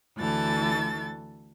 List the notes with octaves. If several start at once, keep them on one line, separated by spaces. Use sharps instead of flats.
D2 E3 A4 A6